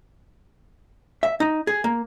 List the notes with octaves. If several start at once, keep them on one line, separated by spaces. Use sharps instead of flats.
E5
D#4
G#4
A#3